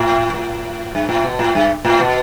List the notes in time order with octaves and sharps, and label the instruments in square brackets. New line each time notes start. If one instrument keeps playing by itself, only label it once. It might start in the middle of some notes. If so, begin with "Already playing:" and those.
Already playing: [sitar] A2
A2
G2
A2
B2
A2
G2
A2
B2